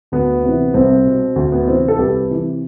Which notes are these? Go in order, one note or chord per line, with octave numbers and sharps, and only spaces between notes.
D2 B3
C3 E3
C2 C4
B2
D2
B3
C3 E3 C4
A4
C2 G4 B4
C3 E3